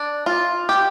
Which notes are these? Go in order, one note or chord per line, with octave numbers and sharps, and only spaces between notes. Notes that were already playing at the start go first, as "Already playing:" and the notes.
Already playing: D4
F4
G4